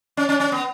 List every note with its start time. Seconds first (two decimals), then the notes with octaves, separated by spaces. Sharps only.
0.17 C#4
0.29 C#4
0.40 C#4
0.52 B3